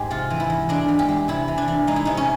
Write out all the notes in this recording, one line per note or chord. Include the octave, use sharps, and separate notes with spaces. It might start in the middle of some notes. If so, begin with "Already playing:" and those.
Already playing: G#2 G#3 G4
C3 F4
E3
E4
E2
G#3 D4
E3
G4
G#3
C3 E4
E3
D4
E3
G#3 D#4
E4
C3 D#4
C#4